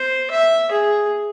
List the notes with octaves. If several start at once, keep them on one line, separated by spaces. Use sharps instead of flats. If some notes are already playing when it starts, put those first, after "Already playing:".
Already playing: C5
E5
G#4